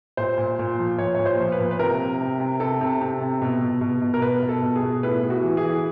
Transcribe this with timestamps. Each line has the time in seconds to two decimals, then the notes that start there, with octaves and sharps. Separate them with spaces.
0.17 A#2 C5
0.38 A#2
0.59 A#2
0.79 F3
0.98 A#2 C#5
1.15 A#2 C#5
1.26 C5
1.40 F3
1.52 B4
1.60 A#2
1.71 B4
1.79 C3 A#4
1.99 C3
2.21 C3
2.40 C3
2.60 C3 A4
2.81 C3
3.01 C3
3.21 C3
3.42 B2
3.62 B2
3.81 B2
4.02 B2
4.14 A#4
4.22 B2 B4
4.43 B2
4.49 A4
4.63 B2
4.76 G#4
4.83 B2
5.03 A2 B4
5.23 A2
5.30 F#4
5.43 E3
5.57 G#4
5.63 E3